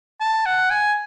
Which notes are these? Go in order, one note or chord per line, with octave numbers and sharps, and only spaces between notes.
A5
F#5
G#5